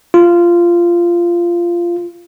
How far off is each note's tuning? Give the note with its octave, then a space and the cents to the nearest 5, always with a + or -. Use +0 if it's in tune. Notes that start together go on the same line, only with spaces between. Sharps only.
F4 -15